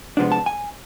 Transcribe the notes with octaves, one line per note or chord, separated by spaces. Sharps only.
C3 F3 G#3 B3 D4
A5
G#5